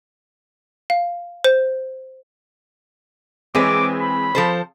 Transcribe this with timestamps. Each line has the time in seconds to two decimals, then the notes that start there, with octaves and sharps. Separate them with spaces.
0.90 F5
1.44 C5
3.55 E3 G#3 C4 G#4 B4 C#5 D6
3.99 B5
4.35 F3 A4 C5